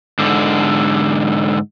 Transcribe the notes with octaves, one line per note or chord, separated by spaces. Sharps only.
G#2 D3